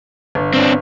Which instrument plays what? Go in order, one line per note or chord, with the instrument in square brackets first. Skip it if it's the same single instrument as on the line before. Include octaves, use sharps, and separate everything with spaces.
[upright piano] G1
[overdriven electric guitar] C4 D4